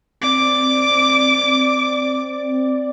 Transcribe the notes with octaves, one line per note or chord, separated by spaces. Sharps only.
C4 D5 D6